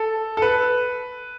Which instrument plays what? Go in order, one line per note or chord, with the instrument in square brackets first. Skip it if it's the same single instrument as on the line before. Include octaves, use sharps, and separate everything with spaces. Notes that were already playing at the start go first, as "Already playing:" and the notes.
Already playing: [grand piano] A4
A4
B4